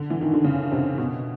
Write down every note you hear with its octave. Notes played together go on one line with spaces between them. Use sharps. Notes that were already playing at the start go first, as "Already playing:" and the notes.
Already playing: D3
E3
D#3
D3
C#3
C3
B2